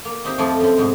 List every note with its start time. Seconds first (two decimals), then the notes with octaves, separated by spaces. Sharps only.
0.05 A#3
0.24 C4 D#4 G4 C5 E5
0.38 F2 F3 A3 F4 D5 G#5
0.60 F#2 C4
0.77 F2 G#2 B2